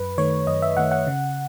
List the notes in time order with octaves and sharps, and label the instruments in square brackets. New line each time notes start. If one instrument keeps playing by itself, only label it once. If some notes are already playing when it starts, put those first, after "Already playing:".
Already playing: [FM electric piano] F#2 B4
D#3 A3 C#5
F#2 D#5
E5
D#3 A3 F#5
F#5
C#3